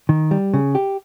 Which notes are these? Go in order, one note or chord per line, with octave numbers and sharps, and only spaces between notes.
D#3
G3
C#3
G4